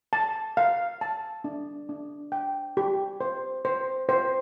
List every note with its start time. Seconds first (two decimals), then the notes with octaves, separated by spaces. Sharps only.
0.13 A5
0.57 F5
1.01 A5
1.44 D4
1.89 D4
2.32 G5
2.77 G4
3.21 C5
3.65 C5
4.09 C5